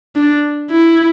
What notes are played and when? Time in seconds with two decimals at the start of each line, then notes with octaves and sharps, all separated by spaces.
0.16 D4
0.71 E4